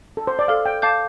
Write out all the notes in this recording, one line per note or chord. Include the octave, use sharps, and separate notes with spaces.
A4
C5
D5
A4 F5
G5
F5 A5 D6 G6